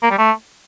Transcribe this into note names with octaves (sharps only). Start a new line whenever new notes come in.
A#3
G3
A3